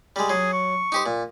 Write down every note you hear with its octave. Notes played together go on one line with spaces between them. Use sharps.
G3 G#3
F#3 G#4
C#6
D#4 G4 C5
A#2